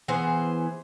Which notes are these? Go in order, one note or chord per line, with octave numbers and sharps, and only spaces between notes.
E3 B3 G#4 C5